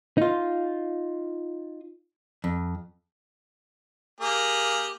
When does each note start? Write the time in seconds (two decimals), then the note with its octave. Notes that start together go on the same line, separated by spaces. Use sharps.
0.18 D#4 F4
2.44 F2
4.21 A#3 G4 G#4